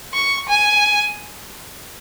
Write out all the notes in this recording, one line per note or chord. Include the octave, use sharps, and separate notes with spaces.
C#6
G#5